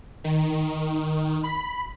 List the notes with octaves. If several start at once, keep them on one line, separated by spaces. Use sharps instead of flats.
D#3
B5